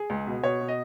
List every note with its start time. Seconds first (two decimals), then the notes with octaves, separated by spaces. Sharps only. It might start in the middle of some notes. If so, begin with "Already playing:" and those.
Already playing: G#4
0.10 C#2
0.27 B2
0.43 B2 C#5
0.61 B2
0.68 D#5